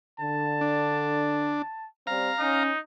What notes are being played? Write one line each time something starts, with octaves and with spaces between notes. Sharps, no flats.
D3 A5
D4
G3 C4 F5 A#5
C#4 D#4